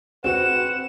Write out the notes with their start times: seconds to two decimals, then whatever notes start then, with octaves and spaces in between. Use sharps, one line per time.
0.24 C4 F#4 B4 F#5 E7